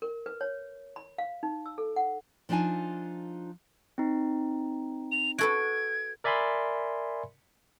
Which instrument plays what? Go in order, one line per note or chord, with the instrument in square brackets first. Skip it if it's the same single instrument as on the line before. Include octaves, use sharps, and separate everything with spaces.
[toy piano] A#4
B4
C#5
B5
F5
D#4
E6
A4
F#5
[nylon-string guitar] F3 D4 D#4 F4 G#5 A5
[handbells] C4 D#4
[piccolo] F7
[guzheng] F#4 A4 B4 [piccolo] G#6 [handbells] D7
[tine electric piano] A#4 D5 E5 G#5 B5 C6